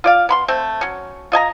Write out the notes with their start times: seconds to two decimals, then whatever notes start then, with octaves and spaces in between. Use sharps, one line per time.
0.04 F4 D5 F5
0.29 B3 B5 C6
0.48 A3 C4
0.81 F#3 C#4
1.32 F4 D#5 G#5 A#5